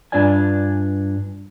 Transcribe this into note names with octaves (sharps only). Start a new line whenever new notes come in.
G2 D4 F4 D5 G#5